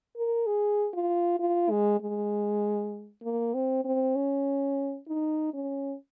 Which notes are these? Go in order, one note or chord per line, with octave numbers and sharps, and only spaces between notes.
A#4
G#4
F4
F4
G#3
G#3
A#3
C4
C4
C#4
D#4
C#4